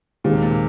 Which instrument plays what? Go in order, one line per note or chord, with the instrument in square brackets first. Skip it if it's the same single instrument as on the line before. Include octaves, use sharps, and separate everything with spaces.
[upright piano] D#2 D#3 G#3 C4 [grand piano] A#2
[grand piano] C3
A#2
C3